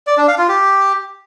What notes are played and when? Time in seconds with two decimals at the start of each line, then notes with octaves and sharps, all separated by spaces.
0.07 D5
0.17 D4
0.28 F5
0.38 F4
0.49 G4